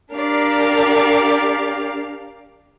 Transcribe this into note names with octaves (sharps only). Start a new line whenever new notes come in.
D4 G4 A#4 D5 F5